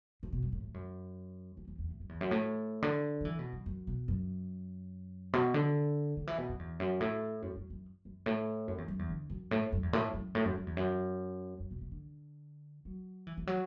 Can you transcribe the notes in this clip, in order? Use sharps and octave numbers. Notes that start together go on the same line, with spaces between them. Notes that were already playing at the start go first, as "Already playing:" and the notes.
A2
B2
F#2
A2
A2
F#2
E2
E2
E2
A2
F#2
E2
F#2
A2
D3
F#3
E3
B2
F#2
F#2
B2
F#2
B2
D3
D3
E3
B2
F#2
E2
F#2
A2
F#2
F#2
F#2
F#2
A2
F#2
E2
F#2
E2
D3
F#2
A2
F#2
E2
A2
F#2
A2
F#2
F#2
E2
F#2
F#2
B2
B2
D3
F#3
E3
E3
F#3